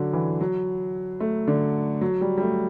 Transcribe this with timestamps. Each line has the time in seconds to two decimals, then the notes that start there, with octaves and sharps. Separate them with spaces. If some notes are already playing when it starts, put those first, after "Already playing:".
Already playing: D3 F#3
0.13 E3
0.41 F#3
1.20 A3
1.47 D3
2.01 F#3
2.21 G3
2.38 G3
2.42 A3